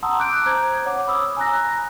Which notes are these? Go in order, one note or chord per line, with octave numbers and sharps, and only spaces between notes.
F#5 A5 A#5 C6 D#6 E6
D6 F#6 G6 D7
C5 A#5 G6 G#6
C#5 F#5 D6
B5 D#6 E6
G#5 A#5 F#6 A#6